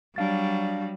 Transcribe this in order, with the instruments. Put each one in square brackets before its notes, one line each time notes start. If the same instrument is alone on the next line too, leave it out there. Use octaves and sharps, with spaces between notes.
[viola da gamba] F#3 G3 F#4 [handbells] D4 F5 A6